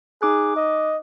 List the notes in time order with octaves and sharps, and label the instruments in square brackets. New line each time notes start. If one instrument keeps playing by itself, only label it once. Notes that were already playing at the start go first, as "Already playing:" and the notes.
[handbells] D#4 D6 F#6 [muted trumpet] G#4
[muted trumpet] D#5